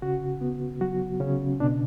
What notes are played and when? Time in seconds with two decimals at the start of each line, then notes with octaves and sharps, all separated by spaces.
0.02 C#3 F#4
0.41 B3
0.81 F#3 F#4
1.20 C#3 C#4
1.60 B2 D4